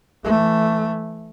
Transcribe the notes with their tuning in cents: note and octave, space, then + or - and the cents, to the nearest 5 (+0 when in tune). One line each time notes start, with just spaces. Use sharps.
E3 +10 A3 +0